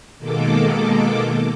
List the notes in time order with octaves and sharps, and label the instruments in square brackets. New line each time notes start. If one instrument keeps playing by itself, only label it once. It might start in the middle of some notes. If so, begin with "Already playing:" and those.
[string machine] B2 D#3 G#3 A#3 A4 D6